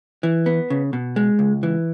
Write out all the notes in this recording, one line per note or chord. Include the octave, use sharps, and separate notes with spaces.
E3
B3
C#3
B2
G#3
C#2
E3